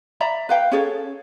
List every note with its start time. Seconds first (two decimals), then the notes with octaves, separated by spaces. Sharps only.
0.20 D5 E5 A#5 B5
0.49 B4 F5 G5
0.72 C#4 G#4 A4 C#5